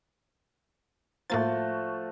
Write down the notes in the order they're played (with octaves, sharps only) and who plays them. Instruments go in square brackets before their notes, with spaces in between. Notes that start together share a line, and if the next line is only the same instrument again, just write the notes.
[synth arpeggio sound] A2 A#3 A6 [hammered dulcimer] F3 A3 F#4